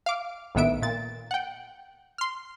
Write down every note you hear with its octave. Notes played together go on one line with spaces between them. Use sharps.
F5 D6
A#1 A2 D#3 B3 E5 D7
A#2 A6
F#5 G5
C6 F6